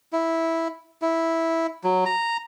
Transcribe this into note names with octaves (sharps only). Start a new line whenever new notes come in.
E4
E4
F#3
A#5